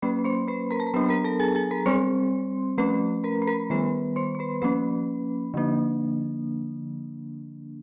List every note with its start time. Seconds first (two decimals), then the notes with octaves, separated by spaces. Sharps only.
0.02 F#3 A#3 C#4 B4 B5
0.19 B5
0.24 C5 C6
0.48 B4 B5
0.71 A#4 A#5
0.80 A5
0.87 A#5
0.94 F#3 B3 D4 B4 B5
1.09 A#4 A#5
1.24 A4 A5
1.40 G#4 G#5
1.55 G#4 G#5
1.71 A#4 A#5
1.86 G3 C4 C5 C6
2.78 F3 A3 C#4 B4 B5
3.24 A#4 A#5
3.42 B5
3.47 A#4 A#5
3.70 D#3 G3 B3 B4 B5
4.16 C5 C6
4.35 C6
4.39 B4 B5
4.62 F3 A#3 C#4 B4 B5
5.54 D3 F3 A#3 D4